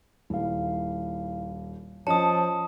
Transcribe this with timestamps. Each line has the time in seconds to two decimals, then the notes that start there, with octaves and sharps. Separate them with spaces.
0.30 D#1 E4 F5
2.07 F3 C#4 F4 D#5 A5 D#6 C#7